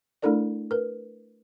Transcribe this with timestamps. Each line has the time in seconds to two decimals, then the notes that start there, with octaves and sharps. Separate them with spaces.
0.22 A3 D4 E4 A4 A#4 D5
0.71 A#4 B4